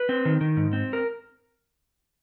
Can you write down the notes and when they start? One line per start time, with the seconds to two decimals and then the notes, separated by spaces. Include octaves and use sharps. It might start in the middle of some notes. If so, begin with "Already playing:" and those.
Already playing: B4
0.09 C4
0.25 D#3
0.41 D#3
0.57 G#2
0.73 C4
0.93 A#4